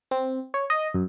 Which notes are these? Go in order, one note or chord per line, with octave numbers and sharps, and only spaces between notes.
C4
C#5
D#5
F#2